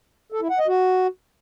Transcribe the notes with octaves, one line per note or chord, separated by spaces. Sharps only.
A4
E4
F#5
D#5
F#4